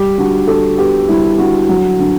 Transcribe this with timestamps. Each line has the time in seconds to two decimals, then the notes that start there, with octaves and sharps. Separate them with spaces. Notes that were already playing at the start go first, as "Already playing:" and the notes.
Already playing: G3 G4
0.18 D3 F#4
0.47 D3 A4
0.78 B3 G4
1.08 G3 E4
1.38 D3 F#4
1.69 F#3
1.99 D3